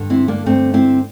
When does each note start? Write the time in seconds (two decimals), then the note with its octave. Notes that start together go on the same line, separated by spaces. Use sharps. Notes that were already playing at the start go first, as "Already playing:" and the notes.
Already playing: G2 D3
0.10 C4 E4
0.28 A#3 D4
0.46 G2 D3 A3 C4
0.73 C4 E4